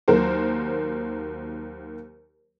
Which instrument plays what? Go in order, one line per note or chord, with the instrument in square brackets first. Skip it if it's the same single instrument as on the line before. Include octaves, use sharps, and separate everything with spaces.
[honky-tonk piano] D#2 F#3 A#4 C5